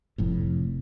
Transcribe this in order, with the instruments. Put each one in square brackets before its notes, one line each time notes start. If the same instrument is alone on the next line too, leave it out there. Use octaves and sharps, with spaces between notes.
[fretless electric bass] F1 F2 A2